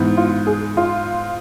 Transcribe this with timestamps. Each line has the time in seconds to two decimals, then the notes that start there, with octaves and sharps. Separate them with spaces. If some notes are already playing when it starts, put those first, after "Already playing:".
Already playing: G#2 E3 B3
0.17 F4
0.47 G#4
0.77 F4